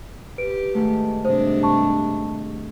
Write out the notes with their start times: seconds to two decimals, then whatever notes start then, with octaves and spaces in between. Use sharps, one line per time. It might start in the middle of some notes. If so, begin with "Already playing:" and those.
0.38 G4 B4 D7
0.74 G#2 D#3 A3
1.25 G2 C3 D4 C5 D#5
1.63 A5 C#6